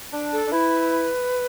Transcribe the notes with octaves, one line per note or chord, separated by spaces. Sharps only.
D4
A4
D4
E4 B4